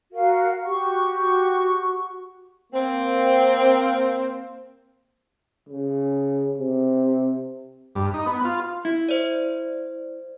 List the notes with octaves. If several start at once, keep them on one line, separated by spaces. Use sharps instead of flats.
F#4 A#4 F5
F#4 G4 C#6
A#3 C4
C#3
C3
G2
D#4
B3
F4
E4
C5 D5